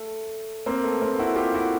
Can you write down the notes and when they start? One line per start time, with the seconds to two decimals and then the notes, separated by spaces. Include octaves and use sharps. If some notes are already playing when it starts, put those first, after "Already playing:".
Already playing: A3
0.66 A#3 C4
0.84 A3 B3
1.02 A#3 C4
1.19 E4 F#4
1.36 F4 G4
1.54 E4 F#4